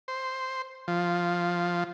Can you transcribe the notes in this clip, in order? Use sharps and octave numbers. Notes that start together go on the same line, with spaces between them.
C5
F3